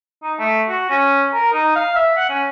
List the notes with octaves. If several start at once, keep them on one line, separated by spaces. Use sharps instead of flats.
D#4
A3
F#4
C#4
A#4
D#4
F5
E5
F#5
C#4